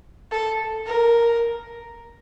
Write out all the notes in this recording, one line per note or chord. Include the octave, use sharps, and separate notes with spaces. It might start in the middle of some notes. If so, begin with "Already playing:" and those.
A4
A#4